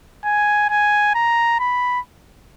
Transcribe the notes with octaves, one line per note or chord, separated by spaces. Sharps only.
G#5
G#5
A#5
B5